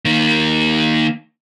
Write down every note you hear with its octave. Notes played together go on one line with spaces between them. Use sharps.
D#3 A#3